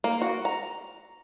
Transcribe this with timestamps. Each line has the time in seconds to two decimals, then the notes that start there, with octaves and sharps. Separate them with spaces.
0.04 A#3
0.22 F#4
0.45 A#5